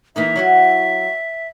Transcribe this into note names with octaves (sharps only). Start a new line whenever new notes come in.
E3 A#3 D#4 E5
F#3 E4 F#4